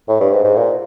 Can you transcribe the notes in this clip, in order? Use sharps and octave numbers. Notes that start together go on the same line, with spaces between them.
A2
G2
G#2
G#2
A#2